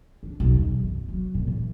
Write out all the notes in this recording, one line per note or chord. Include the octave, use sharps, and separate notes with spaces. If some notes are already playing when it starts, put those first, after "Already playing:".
D4
B1
E2
F#1
F#3
A#2
E3